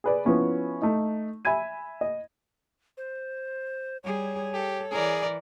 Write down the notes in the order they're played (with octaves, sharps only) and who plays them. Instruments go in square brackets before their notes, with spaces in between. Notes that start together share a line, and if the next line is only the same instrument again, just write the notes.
[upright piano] G#4 B4 D5
F3 B3 C#4 E4
A3 D#4
E5 G#5 B5 G#6 D#7
D#5
[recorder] C5
[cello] G3 G#4 [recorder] C#5
[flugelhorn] G4 [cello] A4
[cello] E3 [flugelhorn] G#4 [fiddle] A#4 D5